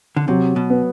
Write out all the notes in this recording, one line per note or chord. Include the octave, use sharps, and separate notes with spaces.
D3
C3 F#3
B2
B3